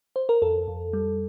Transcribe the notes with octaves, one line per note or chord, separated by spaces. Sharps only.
C5
A#4
F2 A4
F2
G3